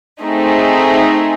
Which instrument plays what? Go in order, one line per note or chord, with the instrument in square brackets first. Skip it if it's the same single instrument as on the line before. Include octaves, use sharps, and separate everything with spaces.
[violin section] A3 C4 D#4 G#4